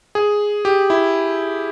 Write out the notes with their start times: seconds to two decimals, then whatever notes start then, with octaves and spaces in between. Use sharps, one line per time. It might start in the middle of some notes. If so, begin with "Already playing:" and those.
0.15 G#4
0.65 G4
0.90 E4